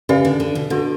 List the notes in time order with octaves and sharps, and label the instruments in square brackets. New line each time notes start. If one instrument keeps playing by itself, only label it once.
[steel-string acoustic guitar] C#3 [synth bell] C#4 G4 B4 D5
[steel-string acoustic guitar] D3
D3
B2
[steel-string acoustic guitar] D3 [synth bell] D4 F#4 A4